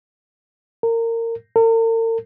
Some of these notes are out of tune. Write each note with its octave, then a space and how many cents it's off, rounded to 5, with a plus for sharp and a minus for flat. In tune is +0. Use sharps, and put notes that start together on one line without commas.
A#4 -25
A#4 -45